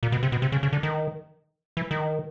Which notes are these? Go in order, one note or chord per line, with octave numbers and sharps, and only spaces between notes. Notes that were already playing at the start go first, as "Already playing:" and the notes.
A#2
B2
C3
B2
C3
C#3
C#3
D3
D#3
E3
D#3